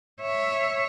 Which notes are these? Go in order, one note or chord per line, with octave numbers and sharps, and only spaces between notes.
C#5 E5